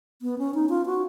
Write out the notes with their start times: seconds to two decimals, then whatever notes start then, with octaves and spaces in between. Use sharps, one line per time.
0.22 B3
0.38 C#4
0.54 D#4
0.69 F4
0.86 F#4